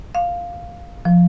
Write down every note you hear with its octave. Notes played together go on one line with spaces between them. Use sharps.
F5
F3